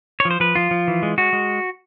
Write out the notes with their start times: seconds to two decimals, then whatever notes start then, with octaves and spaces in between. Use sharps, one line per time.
0.20 C#5
0.25 F3
0.31 C5
0.40 F3 B4
0.55 F3 F4
0.71 F3
0.88 E3
1.03 G#3
1.18 G#3 F#4
1.33 G#3